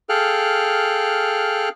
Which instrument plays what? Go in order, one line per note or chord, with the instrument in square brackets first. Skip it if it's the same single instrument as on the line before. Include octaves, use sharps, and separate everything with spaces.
[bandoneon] G#4 A4 F5 G5 F6 F#6